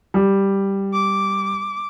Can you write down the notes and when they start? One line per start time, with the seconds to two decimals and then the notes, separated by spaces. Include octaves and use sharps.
0.14 G3
0.93 D6